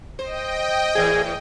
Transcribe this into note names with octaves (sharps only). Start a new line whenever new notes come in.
C5 D#5 G5
A2 E3 G#4